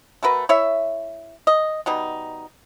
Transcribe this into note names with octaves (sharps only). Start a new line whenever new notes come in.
A3 F#4 A#4 B4
E4 C#5 E5
D#5
B2 G3 D#4